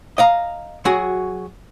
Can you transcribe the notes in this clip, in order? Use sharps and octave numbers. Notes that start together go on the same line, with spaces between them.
D#5 F5 A#5
F#3 F#4 G#4